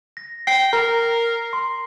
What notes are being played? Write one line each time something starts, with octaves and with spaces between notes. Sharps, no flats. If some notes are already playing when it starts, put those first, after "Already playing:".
A#6
G5 C7
A#4 A#5
C6